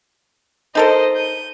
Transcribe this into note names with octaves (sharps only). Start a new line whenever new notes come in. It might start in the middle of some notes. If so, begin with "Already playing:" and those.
D#4 A4 A#4 C5 D#5
G6 D#7